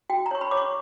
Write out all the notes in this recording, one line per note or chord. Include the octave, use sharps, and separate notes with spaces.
F#4 G5
A#5
C#5 C#6
B5
C#5 D6
C#6